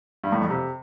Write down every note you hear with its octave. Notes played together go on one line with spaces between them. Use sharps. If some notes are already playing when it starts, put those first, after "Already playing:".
G2
A2
F2
C3